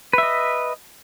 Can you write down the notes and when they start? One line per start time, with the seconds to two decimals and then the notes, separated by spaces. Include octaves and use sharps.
0.13 B4
0.18 E5
0.23 D#5